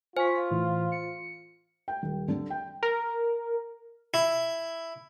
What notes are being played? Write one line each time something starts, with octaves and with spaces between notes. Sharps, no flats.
F4 C5 G#5 C#6 B6
A2 E3
C#7
G5
D#1
D3
G5
A#4
E4